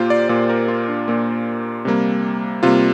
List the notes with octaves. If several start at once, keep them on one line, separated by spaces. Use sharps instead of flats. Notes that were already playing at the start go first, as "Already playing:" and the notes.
Already playing: A#2 A#3 F4 G4 C5
D5
A#2 A#3 D5
A#4
F4
D4
A#2 A#3
C3 G3 A#3
C3 G3 A#3 F4